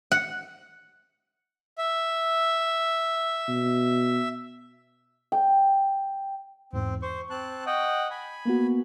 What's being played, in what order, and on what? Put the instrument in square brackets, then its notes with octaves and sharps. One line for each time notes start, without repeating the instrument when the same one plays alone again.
[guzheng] F#5
[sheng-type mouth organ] E5
[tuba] B2
[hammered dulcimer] G5
[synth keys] E2 G#2 [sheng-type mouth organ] C4
[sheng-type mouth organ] C5 [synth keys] C#6
[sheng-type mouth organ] C4 A5 F#6
D#5 F#5 G5
G#5 B5
[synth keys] A#3 B3 F#4